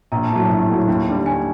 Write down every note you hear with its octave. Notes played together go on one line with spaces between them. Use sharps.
A#1 A#5
A5
A2
F#3 A5
A#1
A2 F#3
D#2
D3 G3
D#2 G#5